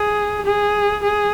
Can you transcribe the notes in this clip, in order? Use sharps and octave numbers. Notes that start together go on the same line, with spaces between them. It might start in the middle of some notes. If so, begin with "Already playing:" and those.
Already playing: G#4
G#4
G#4